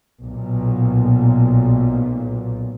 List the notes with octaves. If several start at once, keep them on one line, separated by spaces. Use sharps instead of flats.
B1 A#2